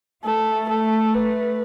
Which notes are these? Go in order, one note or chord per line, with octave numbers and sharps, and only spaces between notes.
A3 A4
A4
B4